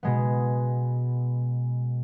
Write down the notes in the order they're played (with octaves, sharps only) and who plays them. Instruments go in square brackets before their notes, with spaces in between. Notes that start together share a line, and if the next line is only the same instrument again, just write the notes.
[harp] B2 G#3 B3